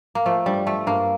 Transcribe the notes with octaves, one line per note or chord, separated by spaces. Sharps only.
A#3
F3 A3
G2 G3
F3 A3
G2 A#3